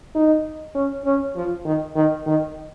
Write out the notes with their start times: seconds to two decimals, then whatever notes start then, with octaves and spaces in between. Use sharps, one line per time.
0.15 D#4
0.75 C#4
1.05 C#4
1.36 F3
1.65 D#3
1.96 D#3
2.27 D#3